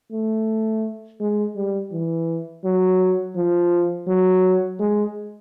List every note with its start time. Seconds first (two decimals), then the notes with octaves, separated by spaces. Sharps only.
0.12 A3
1.20 G#3
1.56 G3
1.92 E3
2.64 F#3
3.36 F3
4.08 F#3
4.79 G#3